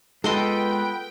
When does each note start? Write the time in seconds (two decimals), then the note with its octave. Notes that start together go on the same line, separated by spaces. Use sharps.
0.24 G#3 B3 F4 A4 B4 D#5 G5 C6